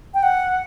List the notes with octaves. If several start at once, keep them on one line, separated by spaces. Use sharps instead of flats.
G5
F#5